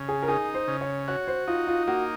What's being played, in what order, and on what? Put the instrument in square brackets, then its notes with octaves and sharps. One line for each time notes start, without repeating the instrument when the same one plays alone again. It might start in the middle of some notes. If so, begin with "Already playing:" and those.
Already playing: [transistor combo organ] C#3
[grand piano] G#4
A#4
[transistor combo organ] D#4 [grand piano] G#4
[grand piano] C5
[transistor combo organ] C#3
[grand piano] C#5
[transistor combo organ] F#4 [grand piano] C#5
[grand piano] C5
[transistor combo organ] D#4 [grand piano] F4
[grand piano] F4
[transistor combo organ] A#3 [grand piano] F#4